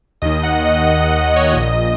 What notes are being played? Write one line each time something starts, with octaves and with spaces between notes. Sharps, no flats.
D#2 D#3 D#5
F#5
D#5
D#5
F#5
D#5
C#5
A#1 A#2 D#5